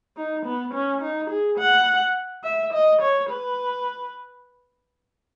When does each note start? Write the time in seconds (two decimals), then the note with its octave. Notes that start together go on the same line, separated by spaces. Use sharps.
0.17 D#4
0.46 B3
0.74 C#4
1.01 D#4
1.30 G#4
1.58 F#5
2.44 E5
2.73 D#5
3.01 C#5
3.29 B4